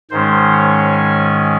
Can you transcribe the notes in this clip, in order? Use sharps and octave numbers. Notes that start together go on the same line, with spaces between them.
G#2 D#3 G#3 C#4 C5
C#5
G#5